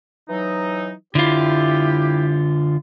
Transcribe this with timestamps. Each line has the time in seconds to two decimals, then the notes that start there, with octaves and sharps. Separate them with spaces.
0.29 E3 F#3 D#4
1.15 D3 E4 F4 G4